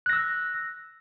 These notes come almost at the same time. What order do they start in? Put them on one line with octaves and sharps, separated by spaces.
F#6 A#6 E6